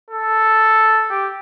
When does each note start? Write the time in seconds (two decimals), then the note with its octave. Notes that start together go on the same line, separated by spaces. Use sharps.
0.11 A4
1.10 G4